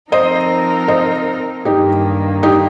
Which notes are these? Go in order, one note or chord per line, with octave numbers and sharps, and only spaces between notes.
F3 C4 D#4 A#4 C5 D#5
C5 D#5
G2 D#3 A#3 D#4 G4
D#4 G4